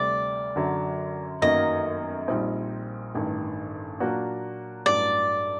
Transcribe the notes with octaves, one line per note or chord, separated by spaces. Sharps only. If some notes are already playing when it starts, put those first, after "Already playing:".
Already playing: D2 C3 G3 D5
F#2 D3 F#3
G1 F#2 D#3 F#3 A#3 D#5
A#1 A#2 G3 C4 D#4
A1 G2 D#3
A#2 F#3 A#3 D4 F#4
A1 G2 F#3 D5